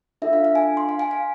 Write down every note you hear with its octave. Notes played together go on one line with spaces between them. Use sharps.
D4 F4 A4 E5
F5
F5
G#5
C6
F5
G#5
F5